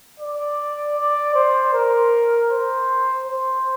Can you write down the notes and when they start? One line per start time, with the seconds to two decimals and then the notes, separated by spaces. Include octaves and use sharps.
0.20 D5
0.96 D5
1.35 C5
1.73 A#4
2.50 C5
3.27 C5